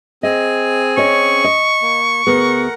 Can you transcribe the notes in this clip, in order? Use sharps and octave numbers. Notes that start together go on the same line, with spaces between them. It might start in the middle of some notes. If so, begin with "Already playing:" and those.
C4 G#4 D#5 G#5
C#4 C#5 D#5 C#6
D#5
A#3
D2 B3 G#4 A#4 F#5